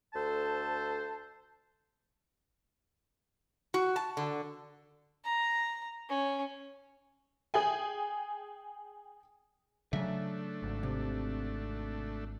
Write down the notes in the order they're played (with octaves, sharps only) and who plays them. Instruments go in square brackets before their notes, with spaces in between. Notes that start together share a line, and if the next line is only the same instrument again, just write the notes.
[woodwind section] D2 A4 C5 A5
[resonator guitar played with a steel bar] F#4
A5
D3
[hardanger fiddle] A#5
C#4
[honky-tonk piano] G#4 G5 G#5
[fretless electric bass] C#3 F#3 [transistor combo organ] A3 D4 [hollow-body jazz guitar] E5
[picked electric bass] G#1
[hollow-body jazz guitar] C3